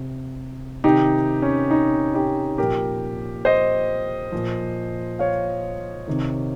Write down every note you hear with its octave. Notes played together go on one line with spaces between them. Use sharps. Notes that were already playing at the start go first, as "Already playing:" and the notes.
Already playing: C3
C3 D#3 D#4 G4
C#4
D#4
D#4 G4
A#2 F3 G4 A#4
C5 D#5
A#2 F3
C#5 F5
C3 D#3